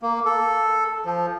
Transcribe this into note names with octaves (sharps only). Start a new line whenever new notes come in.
A#3
A4
F3